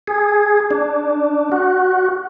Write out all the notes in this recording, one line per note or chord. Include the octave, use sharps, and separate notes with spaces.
G#4
D4
F#4